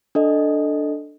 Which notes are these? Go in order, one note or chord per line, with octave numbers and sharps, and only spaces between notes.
D4 A4 D#5